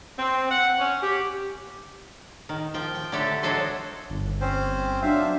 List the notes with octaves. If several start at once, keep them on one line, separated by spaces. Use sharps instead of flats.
C4
F#5
C#4
G4
D#3
F3 G5
G5
D3 F#3 A3 G4 A4
F#3 G#3 D4 A4 C5 D#5
G1
C4 C#4 C5
F#3 D4 C5 E5 F5